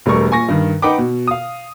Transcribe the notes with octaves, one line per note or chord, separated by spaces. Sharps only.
E1 G3 A3 A#4 C#6
A#2 G#5 C#6 A#6
G2 D#3
D#4 B4 F#5 G5 B5 D6
B2
F5 D#6